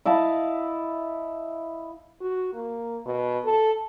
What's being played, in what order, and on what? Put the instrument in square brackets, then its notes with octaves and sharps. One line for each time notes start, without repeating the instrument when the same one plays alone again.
[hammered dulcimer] E4 D#5 F5 A5
[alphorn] F#4
A#3
B2
A4